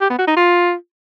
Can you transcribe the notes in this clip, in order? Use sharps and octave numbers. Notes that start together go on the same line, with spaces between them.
G4
B3
F#4
D#4
F4